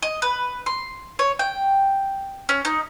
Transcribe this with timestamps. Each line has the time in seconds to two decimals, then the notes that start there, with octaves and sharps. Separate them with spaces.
0.02 D#5
0.22 B4
0.66 C6
1.19 C#5
1.39 G5
2.49 C#4
2.65 D#4